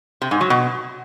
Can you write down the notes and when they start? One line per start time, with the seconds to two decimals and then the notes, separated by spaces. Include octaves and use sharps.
0.22 C3
0.31 G#2
0.41 F#3
0.50 B2